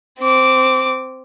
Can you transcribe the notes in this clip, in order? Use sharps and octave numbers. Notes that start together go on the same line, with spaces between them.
C4 D6